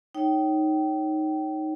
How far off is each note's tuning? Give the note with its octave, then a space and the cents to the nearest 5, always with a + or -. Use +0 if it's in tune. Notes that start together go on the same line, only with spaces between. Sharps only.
D#4 +0 C#5 +0 G5 -25